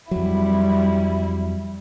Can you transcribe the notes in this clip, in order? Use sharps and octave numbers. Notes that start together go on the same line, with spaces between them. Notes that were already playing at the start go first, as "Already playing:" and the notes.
F2 F#3 G3 E4